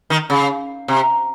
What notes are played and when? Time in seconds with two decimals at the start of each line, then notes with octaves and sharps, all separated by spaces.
0.10 D#3
0.30 C#3
0.88 C3